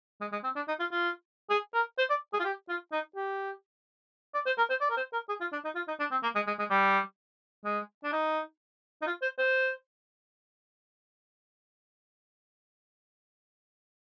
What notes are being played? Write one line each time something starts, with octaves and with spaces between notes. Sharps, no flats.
G#3
G#3
C4
D4
D#4
F4
F4
G#4
A#4
C5
D5
G#4
F4
G4
F4
D#4
G4
D5
C5
A#4
C5
D5
A#4
C5
A#4
G#4
F4
D4
D#4
F4
D#4
D4
C4
A#3
G#3
G#3
G#3
G3
G#3
D4
D#4
D#4
F4
C5
C5